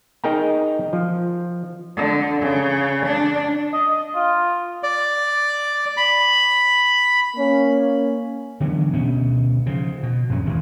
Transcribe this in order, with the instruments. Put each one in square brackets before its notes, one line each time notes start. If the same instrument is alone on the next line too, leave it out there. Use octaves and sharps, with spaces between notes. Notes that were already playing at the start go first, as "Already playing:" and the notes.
[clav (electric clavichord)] D#4 G#4 A#4 G5 A#5
F3
[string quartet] D3
C#3
D4
[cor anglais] D#5
D#5
F4
[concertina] D5
B5
[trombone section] A#3 C#4
[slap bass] D3 E3 F#3 B3
D2 B2 B3 C#4
C#3 F3
B2
A#1 F#2 F#3 C#4
G1 E2 C#3 E3